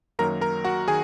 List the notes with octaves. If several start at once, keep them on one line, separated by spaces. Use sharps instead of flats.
F#2 D#3 F#3 A#3 A#4 A#5
A#4 A#5
F#4 F#5
D#3 G#4 G#5